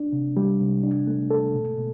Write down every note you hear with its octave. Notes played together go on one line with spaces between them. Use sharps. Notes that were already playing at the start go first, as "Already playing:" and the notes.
Already playing: D4
C3
G3
C3
D4
A3
A4
B2
B2